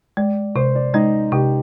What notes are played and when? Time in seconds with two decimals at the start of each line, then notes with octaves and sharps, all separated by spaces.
0.17 G#3 D5
0.55 C3 C5
0.75 D5
0.94 G#3 D#4 D#5
1.32 C3 G4 G5